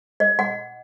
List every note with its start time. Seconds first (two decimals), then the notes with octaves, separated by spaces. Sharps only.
0.20 D#5
0.39 F#5